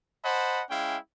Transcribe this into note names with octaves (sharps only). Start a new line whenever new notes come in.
C5 D#5 F#5 A5 B5
G#3 C#4 E4 F5 G5